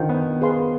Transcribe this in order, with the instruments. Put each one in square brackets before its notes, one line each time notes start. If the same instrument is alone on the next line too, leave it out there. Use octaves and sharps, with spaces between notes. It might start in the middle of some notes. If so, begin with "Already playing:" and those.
Already playing: [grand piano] D3 D#3 [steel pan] F4 C5 G5
[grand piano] B3
[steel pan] G#4 B4 F5 C6